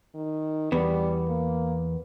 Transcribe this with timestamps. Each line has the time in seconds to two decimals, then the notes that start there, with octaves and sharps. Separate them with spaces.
0.15 D#3
0.72 E2 G3 B3
1.28 A#3